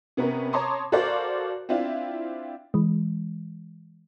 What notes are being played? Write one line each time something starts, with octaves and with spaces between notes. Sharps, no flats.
C3 B3 C#4 A#4
C#5 A5 A#5 C6 D6 D#6
F#4 A4 A#4 C5 D5 F5
C4 D4 E4 F4
E3 G#3